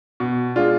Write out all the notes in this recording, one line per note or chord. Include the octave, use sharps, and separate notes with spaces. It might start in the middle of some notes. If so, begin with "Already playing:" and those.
B2
G#3 D4 F4